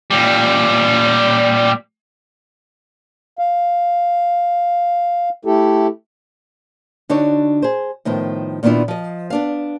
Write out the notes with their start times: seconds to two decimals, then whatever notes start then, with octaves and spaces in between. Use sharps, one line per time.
0.11 A#2 G3
3.39 F5
5.45 A3 E4 G4 A4
7.09 D3 D4 D#4 F#4 C#5
7.62 G#4 C5
8.05 A2 D#3 F3 B3
8.63 A#2 D#3 B3 D4 E4 F4
8.88 F3 D#5
9.30 B3 D4 F5